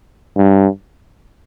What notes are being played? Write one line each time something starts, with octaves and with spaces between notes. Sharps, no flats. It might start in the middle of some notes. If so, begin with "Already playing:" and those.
G2